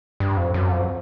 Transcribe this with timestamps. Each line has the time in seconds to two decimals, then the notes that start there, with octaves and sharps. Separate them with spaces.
0.20 G2
0.37 F2
0.54 F#2
0.71 F2